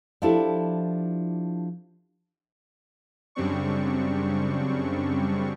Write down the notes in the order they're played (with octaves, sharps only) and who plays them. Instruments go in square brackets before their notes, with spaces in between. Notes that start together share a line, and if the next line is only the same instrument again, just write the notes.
[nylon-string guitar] F3 D4 E4 G4 A4
[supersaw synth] F#2 C#3 G3 C4 D4 C#6